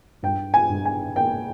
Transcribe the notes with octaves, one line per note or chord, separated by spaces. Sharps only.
G2 G5
G#5
G2
G#5
A#3 G5